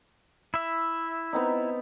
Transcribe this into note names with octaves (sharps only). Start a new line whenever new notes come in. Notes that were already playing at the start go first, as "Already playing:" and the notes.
E4 E5
B3 C4 D#4